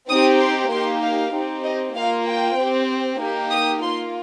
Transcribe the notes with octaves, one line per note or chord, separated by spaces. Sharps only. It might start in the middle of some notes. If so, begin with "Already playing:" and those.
C4 D#4 G4 D#6
C6
A#3 D#4 G4 C6
F5
C4 D#4 G4
D#5
A#3 F4 F5
G5
C4 G4
A#3 D#4 G4
D#6
A#3 F4 C6